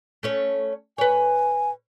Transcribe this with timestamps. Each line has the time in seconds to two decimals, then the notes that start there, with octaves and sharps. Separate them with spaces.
0.23 A3 C#4 C#5
0.98 B4 C#5 G#5